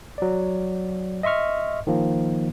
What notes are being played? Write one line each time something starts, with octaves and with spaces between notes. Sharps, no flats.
F#3 D5
D#5 E5 C6 C#6 F6
D#3 F3 A#3